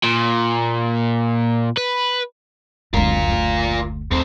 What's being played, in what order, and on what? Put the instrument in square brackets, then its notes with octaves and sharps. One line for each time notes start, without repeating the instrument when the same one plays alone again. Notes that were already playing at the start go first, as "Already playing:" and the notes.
[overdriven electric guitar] A#2
B4
[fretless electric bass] F#1 D2 [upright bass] G#3 C4 [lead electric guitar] F4 A#4
[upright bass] D3 A3
[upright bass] D#2 D3 [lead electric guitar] A2 C4